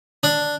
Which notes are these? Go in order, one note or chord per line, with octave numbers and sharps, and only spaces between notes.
D4